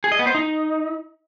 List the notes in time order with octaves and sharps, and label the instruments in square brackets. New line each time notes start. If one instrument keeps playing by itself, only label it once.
[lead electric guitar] G#4
D#5
B3
C5
D#4